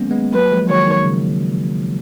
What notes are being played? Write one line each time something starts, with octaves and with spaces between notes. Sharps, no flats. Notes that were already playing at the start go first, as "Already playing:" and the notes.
Already playing: D#3 F#3 G#3 A#3 B3 C#4
G#3 B3
F#3 A#3 B4
F3 G#3
D#3 F#3 C#5
D#3
C#3